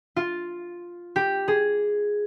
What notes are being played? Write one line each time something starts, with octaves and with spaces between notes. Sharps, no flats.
F4
G4
G#4